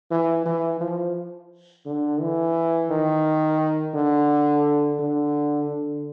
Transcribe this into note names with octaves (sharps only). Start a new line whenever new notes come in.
E3
E3
F3
D3
E3
D#3
D3
D3
D3